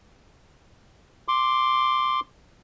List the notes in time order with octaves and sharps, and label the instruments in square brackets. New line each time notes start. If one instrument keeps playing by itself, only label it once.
[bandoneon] C6 D6